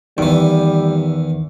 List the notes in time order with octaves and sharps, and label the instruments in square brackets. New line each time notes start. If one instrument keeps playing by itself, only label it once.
[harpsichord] E2 E3 [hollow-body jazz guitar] D#3 [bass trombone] G3